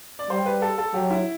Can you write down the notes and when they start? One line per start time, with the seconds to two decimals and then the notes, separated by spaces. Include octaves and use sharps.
0.19 D5
0.30 G3 C5
0.46 B4
0.62 A4
0.78 A4
0.94 F#3 G4
1.10 E4